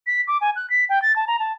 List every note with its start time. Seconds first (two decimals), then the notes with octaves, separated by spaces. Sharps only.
0.07 B6
0.27 D6
0.41 G#5
0.56 F#6
0.70 B6
0.89 G5
1.02 A6
1.16 A5
1.27 A#5
1.39 A5